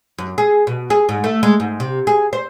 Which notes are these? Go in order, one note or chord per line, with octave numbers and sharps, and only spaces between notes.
F#2
G#4
B2
G#4
G#2
A3
G#3
G#2
C3
G#4
C5